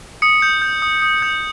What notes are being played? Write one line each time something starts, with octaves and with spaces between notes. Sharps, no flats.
D#6 C#7
G6
G6
D#6
D#6
G6